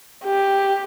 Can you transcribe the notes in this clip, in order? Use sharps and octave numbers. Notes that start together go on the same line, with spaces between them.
G4